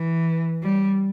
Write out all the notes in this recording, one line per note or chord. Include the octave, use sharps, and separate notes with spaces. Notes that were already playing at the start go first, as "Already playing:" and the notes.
Already playing: E3
G3